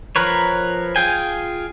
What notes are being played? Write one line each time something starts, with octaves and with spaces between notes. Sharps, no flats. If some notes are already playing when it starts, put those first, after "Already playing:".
F3 A#4 B4 C#5
F4 G#4 G5 G#5